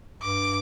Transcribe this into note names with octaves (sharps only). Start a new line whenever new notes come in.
G2 D6